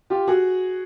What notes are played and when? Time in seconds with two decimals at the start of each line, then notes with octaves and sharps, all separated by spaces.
0.10 F4 G4
0.27 F#4 G#4